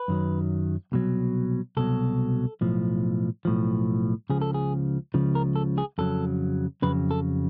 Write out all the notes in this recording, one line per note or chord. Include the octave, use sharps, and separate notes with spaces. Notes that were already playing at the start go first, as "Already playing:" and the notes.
Already playing: B4
F#2 D#3 F#3
C2 B2 F#3
C2 B2 F#3 A4
B1 A2 F3
B1 A2 F3
C#2 C#3 F3 G#4
A4
G#4
C#2 C#3 F3
A#4
A4
G#4
F2 C#3 F#3 A4
F2 C#3 F#3 B4
A4